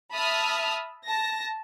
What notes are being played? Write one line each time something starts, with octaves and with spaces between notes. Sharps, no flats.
E5 A5 B5 D#6 F6
A5 A#6